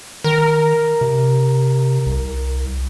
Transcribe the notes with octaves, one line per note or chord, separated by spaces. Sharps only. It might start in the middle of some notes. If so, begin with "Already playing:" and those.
D#3 A#4
C3
C2